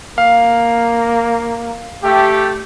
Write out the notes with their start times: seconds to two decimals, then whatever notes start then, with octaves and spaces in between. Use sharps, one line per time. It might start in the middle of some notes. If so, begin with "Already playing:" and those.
0.18 A#3 F5
2.03 A3 G4